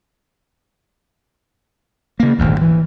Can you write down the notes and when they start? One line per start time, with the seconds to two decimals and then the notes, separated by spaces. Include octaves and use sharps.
2.20 C#3 A#3
2.39 D#1 G#1 D2
2.61 E3